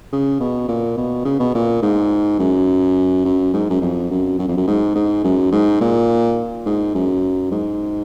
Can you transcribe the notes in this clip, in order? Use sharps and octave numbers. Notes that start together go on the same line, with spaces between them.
C#3
B2
A#2
B2
C#3
B2
A#2
G#2
F#2
F#2
G#2
F#2
F2
F#2
F#2
F2
F#2
G#2
G#2
F#2
G#2
A#2
G#2
F#2
G#2